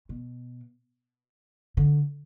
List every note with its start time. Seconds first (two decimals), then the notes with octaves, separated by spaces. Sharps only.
0.09 B2
1.77 D3